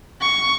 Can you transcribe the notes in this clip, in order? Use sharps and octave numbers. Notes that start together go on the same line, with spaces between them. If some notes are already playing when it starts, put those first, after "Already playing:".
C#6